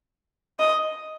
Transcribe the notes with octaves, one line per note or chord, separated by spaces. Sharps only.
D#5